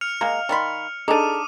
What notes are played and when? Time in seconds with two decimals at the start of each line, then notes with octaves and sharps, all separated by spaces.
0.01 F6 C#7 F7
0.21 G#3 A#3 D#5 F5 A#5
0.49 D#3 D5 F5 B5 C6
1.08 D4 D#4 G#4 A4 D6 D#6 D#7